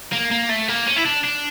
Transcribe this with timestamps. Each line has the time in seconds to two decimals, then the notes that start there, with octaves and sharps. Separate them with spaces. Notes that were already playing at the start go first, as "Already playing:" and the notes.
0.13 A#3
0.31 A#3
0.49 A3
0.68 A#3
0.87 C#4
0.96 E4
1.05 D4
1.24 D4